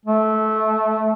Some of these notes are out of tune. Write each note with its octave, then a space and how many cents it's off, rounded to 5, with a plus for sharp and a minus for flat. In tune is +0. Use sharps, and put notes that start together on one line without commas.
A3 -15